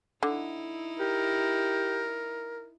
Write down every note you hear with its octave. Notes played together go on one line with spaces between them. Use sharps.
D3 D#4 E4
G4 A#4